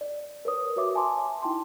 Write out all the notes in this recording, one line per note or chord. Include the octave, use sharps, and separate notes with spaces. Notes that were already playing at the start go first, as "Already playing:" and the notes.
D5
A#4 B4 C#5 D#6
F#4 B4 C#5 E5 D6
E5 G#5 A5 C6 D6
D#4 E4 G5 A5 C6